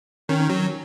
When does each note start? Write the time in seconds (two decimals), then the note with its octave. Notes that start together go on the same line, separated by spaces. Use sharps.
0.29 D#3 C#4
0.50 F#3